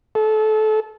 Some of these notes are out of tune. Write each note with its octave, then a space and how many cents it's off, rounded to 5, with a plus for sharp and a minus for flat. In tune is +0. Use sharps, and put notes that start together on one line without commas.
A4 -25